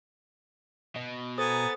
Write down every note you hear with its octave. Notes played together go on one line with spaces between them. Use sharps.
B2 D#5
B3 A4 C5 G#5 A#5 D#6 A6